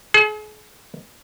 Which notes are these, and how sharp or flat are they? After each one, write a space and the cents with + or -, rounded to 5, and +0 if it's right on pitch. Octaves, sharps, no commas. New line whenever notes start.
G#4 +40